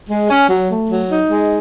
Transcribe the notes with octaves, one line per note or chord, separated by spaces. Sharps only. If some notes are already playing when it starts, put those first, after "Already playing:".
G#3
C#4
F#3
A3
F#3
D#4
G#3